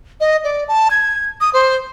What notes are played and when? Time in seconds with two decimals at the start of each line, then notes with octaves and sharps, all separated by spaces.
0.20 D#5
0.44 D5
0.68 A5
0.91 G#6
1.41 D#6
1.53 C5